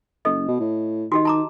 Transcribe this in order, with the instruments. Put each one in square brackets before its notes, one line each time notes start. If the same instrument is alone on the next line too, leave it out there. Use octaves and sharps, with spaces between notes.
[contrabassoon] F#1 [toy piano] A4 D#5
[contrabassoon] B2
A2
[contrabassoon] D#3 [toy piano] F#4 G4 D#5
[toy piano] A5 A#5 D6